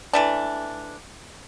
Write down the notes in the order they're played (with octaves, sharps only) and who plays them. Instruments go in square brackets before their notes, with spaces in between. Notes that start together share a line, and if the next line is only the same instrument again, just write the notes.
[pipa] E3 A3 D4